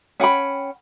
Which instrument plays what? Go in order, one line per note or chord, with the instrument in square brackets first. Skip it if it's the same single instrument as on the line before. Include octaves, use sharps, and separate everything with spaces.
[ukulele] C#4 F#5 G5 B5